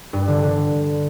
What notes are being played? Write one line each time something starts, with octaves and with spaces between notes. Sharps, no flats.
G2
D3
D3